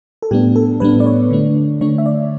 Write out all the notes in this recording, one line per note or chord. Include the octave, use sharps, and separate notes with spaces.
A4
A2 G3 B3 D4 G4
A4
A2 G3 B3 D4 B4
D5
C#5
D3 A3 D4
D3 A3 D4 C#5
E5
D5